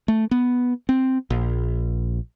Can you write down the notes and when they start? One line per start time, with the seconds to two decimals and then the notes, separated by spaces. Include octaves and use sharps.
0.08 A3
0.31 B3
0.89 C4
1.30 A#1